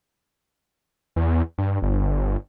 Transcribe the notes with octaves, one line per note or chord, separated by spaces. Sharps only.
E2
G2
G1